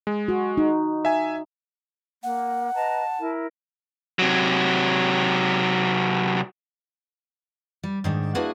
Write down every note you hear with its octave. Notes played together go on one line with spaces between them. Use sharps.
G#3
F#4
D#4
E5 G#5
A#3 F#5
B4 D#5 A5 A#5
E4 A#4
C3 F#3
G3
G#2 D#3 D4
A#3 D4 E4 F#4 G#4 B4